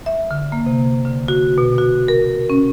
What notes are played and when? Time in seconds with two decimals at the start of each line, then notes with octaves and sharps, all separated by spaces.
0.06 E5
0.31 D3
0.52 A#3
0.66 C3
1.05 D3
1.28 F#4
1.58 B2
1.78 F#4
2.08 A#4
2.50 C#4